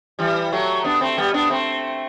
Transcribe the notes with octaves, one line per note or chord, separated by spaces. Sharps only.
E3 G3
F#3 A3
B3 D4
A3 C4
G3 B3
B3 D4
A3 C4